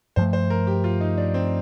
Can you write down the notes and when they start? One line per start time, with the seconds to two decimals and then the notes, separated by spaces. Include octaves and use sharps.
0.16 G2 F3 A3 C5
0.33 C5
0.50 A#4
0.67 G4
0.84 F4
1.01 D#4
1.18 D4
1.34 C4